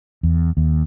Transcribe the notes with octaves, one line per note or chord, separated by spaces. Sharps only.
E2
D#2